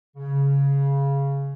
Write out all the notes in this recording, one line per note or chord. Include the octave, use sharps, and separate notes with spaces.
C#3